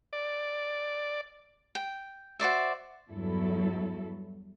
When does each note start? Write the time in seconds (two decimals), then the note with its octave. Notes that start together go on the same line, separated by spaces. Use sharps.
0.13 D5
1.75 G5
2.39 F#4 C5 D5 E5
3.09 E2 G2 F#3 E4 A4